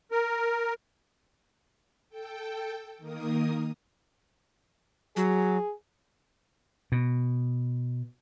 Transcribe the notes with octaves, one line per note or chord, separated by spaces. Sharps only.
A#4
A4 G5
D#3 A#3 A#4 D#6
F#3 G#4
B2